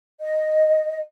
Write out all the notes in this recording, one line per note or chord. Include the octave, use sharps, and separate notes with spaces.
D#5